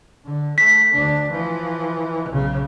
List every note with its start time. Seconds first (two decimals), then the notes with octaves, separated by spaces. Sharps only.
0.24 D3
0.58 A3 B6
0.93 D2 D4
1.31 E3 F3
2.30 B1 C#3